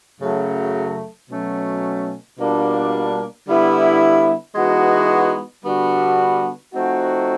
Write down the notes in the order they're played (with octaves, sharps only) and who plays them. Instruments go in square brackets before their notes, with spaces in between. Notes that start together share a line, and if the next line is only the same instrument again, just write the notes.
[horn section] F#2 C#3 F#3 A3
B2 F#3 A3 C#4
B2 G3 A#3 D4 F4
D3 G3 B3 E4
E3 G#3 B3 D#4 F#4
D3 G3 B3 D4 F#4
F3 A3 C4 D#4 F#4